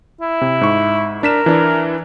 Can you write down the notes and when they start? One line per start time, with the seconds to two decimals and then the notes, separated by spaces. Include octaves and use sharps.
0.21 E4
0.41 C3
0.61 G#2 C#6
1.23 D4 A#4 B6 E7
1.46 E3 D4 E4